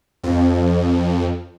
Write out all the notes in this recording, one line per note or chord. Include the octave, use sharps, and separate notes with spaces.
F2